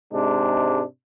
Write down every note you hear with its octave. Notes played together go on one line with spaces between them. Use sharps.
G#2 C3 G#3 D4